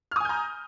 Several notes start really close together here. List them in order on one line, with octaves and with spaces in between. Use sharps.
F6 D#6 G#5 G6 A#5